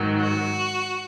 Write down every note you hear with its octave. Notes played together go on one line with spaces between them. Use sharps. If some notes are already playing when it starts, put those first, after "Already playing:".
Already playing: G#2 D#3 F#3
F#4